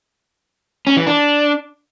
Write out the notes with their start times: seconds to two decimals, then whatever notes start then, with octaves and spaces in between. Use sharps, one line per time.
0.87 C#4
0.97 E3
1.07 D4